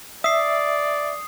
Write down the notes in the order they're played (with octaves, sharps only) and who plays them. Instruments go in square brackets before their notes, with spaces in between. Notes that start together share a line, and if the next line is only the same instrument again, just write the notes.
[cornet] D5 [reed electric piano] E5 [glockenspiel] D#6 C7